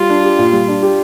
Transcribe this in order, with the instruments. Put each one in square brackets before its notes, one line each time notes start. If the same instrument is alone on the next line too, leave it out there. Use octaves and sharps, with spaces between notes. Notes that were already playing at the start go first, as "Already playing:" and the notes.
Already playing: [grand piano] G3 [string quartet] F4
[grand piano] D4
G4
A#2
G3
D4
G4